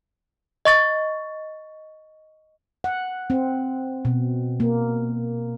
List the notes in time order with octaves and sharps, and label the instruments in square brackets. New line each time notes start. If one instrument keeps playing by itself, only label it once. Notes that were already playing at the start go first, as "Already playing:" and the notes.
[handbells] D#5 C#6 A6
[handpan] F#5
C4
B2
A#3